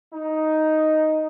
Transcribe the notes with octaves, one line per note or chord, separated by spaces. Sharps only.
D#4